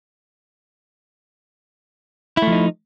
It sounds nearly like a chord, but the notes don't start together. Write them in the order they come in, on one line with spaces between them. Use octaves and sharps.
E4 A3 F3 D#4